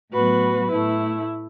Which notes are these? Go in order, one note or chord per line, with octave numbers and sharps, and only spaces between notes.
A2 F#3 B3 F#4 B4
A2 A3 E4